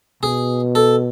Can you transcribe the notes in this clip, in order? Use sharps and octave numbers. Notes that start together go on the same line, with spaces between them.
B2 G#4
A4